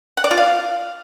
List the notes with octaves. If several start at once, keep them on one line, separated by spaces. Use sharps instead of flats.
F#5
D5
F4
F5